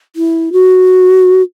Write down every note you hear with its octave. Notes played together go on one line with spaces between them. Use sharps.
E4
F#4